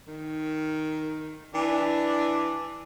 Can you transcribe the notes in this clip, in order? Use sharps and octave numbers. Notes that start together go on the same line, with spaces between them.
D#3
E3 D4